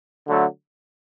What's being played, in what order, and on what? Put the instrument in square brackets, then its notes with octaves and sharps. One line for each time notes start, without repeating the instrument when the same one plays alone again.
[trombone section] D3 F#3 A3